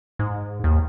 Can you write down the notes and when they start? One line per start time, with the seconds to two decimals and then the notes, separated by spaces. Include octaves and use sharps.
0.19 G#2
0.64 D#2